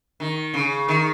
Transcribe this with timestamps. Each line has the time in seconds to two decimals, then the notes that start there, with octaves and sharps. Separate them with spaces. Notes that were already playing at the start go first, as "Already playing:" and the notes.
0.20 D#3
0.54 C#3
0.88 D#3